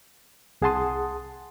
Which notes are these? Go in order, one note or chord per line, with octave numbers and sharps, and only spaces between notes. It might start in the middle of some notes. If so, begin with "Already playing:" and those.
C2 G#4 F#5 A5 C6 D#6